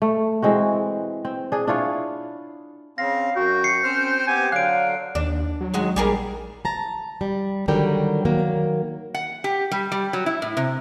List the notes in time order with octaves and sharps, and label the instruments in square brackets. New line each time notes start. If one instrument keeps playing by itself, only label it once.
[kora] A3
E3 G#3 C4 F#4
C4
D4 G#4
D4 E4 F4 C#5
[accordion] C#3 C4 [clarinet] F5 [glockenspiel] A#6
[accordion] F#2 [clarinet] F#4 [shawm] G5
[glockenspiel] C7 C#7
[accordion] C4 C5 F6 [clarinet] C#4
[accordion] B3 C4 G4 [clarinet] G#5
[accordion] D3 F#3 [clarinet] F5 [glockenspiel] F#6 D7
[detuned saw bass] D#2 [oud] D4
[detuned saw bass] F#3
[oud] D#3 G#3 F#4
[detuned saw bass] A#1 [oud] G3 G#4 A#4
[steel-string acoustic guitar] A5 A#5
G3
D3 D#3 F#3 G3 A#4 G5
D#3 F#3 A#3
[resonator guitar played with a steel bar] F#5
G4
G3
G3
F#3
E4
A2
C3